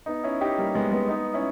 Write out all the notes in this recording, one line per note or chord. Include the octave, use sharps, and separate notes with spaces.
B3 D#4
C#4 E4
D#4 G4
G3 A#3
G#3 B3
G#3 B3
B3 D#4
C#4 E4